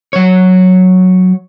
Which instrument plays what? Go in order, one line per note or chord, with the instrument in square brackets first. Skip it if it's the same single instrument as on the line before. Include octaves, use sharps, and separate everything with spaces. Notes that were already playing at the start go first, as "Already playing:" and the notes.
[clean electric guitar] F#3 C#5